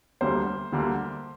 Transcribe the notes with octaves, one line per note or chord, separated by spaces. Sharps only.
D2 D3 G3 A#3 C5
D2 D3 G3 A#3